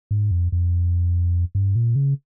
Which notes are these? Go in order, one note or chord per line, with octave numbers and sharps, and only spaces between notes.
G#2
F2
F2
G2
A#2
C#3